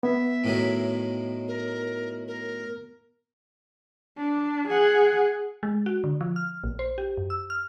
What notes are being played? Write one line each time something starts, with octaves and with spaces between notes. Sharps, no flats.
B3 E5
A2 D#3 F#3
A#4
A#4
D4
G#4 F#5
G#3
F#4
D3
F3
F6
A#1
C5
G4
F#2
E6
F6